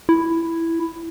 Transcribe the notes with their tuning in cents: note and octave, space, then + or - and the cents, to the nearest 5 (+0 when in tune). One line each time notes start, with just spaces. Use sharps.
E4 +5